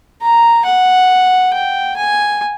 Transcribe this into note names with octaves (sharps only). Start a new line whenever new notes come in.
A#5
F#5
G5
G#5